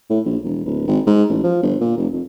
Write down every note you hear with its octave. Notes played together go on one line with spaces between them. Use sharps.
A2
A#1
E1
D1
G#1
G#2
A1
F3
G1
A#2
F1
F2